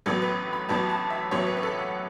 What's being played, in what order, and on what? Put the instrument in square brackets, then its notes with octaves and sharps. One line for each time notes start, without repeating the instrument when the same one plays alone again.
[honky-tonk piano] A1 A2 F#3 B3 A4
B4
B5
A1 A2 F#3 B3 A5
A5
E5
A1 A2 F#3 B3 C#5
B4
B4
A4
F#5